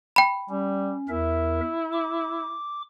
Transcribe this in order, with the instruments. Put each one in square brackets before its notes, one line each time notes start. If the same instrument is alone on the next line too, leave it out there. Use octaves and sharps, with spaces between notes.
[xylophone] G5 B5
[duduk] G3 [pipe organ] C#4
[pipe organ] E2 A#4 E5 [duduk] E4
[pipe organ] D6